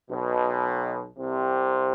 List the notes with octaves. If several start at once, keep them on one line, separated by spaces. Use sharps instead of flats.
B1 B2
C2 C3